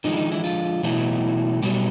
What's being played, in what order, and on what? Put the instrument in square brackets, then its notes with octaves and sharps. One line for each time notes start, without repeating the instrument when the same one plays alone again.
[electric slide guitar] D3 D#3 F3 G#3 D#4
E4
D#3 D#4
E3 E4
F3 F4
B2 E3 F#3 A3 E4
B2 F#3 G3 A3 G4